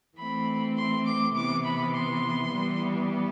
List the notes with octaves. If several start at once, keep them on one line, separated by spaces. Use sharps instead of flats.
E3 A3 C4 B5
C6
D6
C3 E3 B3 D6
B5
C6
E3 G3 B3